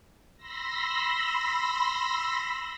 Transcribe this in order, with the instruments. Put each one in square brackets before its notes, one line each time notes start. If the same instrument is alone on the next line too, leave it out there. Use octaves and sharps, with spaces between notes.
[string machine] B5 C6 E6 A#6